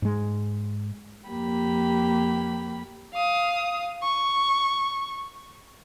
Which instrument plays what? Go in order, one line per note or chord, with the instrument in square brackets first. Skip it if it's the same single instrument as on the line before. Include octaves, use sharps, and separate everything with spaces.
[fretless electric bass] G#2 G#3
[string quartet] F2 A#3 G4 B5
[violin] F5 D#6
C#6